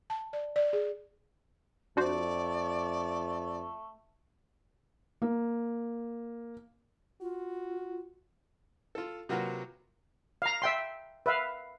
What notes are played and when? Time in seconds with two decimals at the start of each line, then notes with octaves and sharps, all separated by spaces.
0.10 A5
0.33 D5
0.56 D5
0.73 G#4
1.97 F2 A3 D4 F#4 C5 D5
5.22 A#3
7.21 F4 F#4
8.95 F4 A4
9.29 C3 F#3 A#3 F4 F#4 B4
10.42 F5 A#5
10.62 E5 G5 C6
11.26 B4 E5 F5